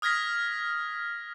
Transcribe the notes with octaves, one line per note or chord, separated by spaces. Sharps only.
D#6 F6 G#6 A#6 B6